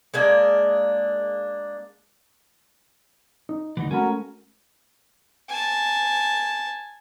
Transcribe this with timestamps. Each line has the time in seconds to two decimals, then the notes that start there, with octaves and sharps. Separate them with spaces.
0.14 G#3 A#3 D4
3.49 D#4
3.77 D2 E3 D#4
3.91 G#3 A3 C#4 F#4 A#4 B5
5.49 G#5 A5